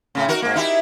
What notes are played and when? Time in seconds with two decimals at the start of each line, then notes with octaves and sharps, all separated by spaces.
0.15 A2 C#3
0.28 D#4 F#4 A#4
0.42 G#2 A#3
0.56 D#4 E4 G4